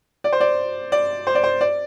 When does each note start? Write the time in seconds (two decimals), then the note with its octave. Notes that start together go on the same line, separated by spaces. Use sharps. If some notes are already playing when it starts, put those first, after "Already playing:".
0.24 D5
0.32 C5
0.40 D5
0.92 D5
1.27 C5
1.35 D5
1.44 C5
1.61 D5